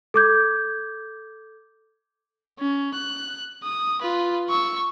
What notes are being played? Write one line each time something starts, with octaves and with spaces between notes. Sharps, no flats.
A4 D6 G6 G#6
C#4
F#6
D#6
F4 B4
C#6 E6